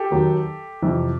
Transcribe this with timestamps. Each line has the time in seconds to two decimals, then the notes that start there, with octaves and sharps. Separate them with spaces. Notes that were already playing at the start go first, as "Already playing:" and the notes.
Already playing: G4 A4
0.11 D#2 D#3 F#3
0.82 F2 C3 E3